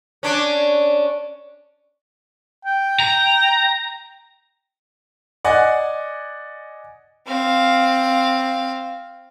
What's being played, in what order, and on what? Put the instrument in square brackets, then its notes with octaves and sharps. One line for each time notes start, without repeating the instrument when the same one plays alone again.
[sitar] C#4 D4
[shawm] G5
[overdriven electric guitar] A#5
[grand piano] D5 D#5 F#5 G#5
[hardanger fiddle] C4 F5